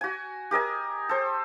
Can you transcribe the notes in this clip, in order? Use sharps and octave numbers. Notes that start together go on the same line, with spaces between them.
F#4 G#5
G4 A#4 D#5 G#5
A4 C5